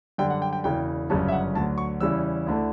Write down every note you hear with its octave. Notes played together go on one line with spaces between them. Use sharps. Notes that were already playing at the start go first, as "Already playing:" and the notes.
F#2 D3 G3 G5
F#5
G5
G5
E1 E2 C#3 E3 G5
G1 F#2 C#3 G3 C#4 A5
E5
F#5
D2 D3 F#3 A5
C#6
E2 C#3 G3 C#4 E4 E6
D2 D3 A3 E4